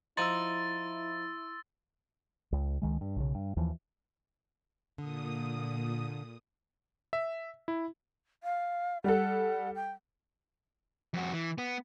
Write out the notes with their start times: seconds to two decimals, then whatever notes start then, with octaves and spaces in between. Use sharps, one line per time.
0.17 F3 D#4 E4 C6 E6 A6 D7 D#7
2.52 C#2
2.82 C#2 D#3 G#3
3.01 G2
3.16 B1 C#3
3.35 G2
3.56 D#2 E3 F3
4.98 A#2 D3 D#6
7.13 E5
7.68 E4
8.43 F5
9.04 G3 A4 F#5
9.75 G5
11.14 F2 F#4
11.33 E3
11.58 B3